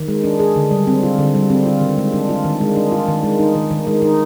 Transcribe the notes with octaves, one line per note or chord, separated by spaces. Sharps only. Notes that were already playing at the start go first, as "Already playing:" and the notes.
Already playing: D#3
G#3
D4
G#4
D3
G3
C4
F4
D3
G3
C4
F4
D#3
G#3
D4
F4
D#3
G#3
D4
F4
D#3
G#3
D#4
D#3
D#3
G#3
D#4